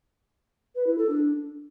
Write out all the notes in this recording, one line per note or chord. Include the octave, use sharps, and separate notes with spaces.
B4
E4
A4
D4